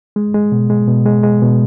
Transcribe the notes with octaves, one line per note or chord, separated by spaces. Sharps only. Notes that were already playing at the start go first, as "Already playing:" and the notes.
G#3
G#3
B2
G#3
B2
G#3
G#3
B2